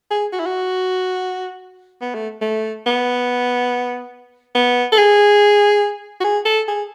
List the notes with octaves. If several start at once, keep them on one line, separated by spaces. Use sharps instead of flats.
G#4
F#4
E4
F#4
B3
A3
A3
B3
B3
A4
G#4
F#4
G#4
A4
G#4